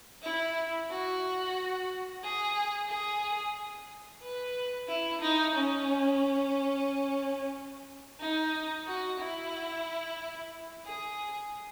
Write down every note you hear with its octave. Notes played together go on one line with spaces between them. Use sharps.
E4
F#4
G#4
G#4
B4
E4
D#4
C#4
D#4
F#4
E4
G#4